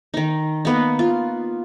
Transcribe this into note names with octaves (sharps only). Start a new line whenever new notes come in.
D#3 D#4
A#3 B3 D#4
F4